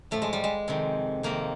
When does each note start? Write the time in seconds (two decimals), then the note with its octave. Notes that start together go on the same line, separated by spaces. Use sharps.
0.11 A2 F3 A3
0.22 G#3
0.33 G3
0.44 G#3
0.68 F2 C3 D#3
1.23 F2 C3 D#3 A#3